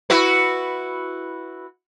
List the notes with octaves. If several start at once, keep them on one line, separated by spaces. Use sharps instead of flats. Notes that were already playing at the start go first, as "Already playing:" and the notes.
E4 F#4 B4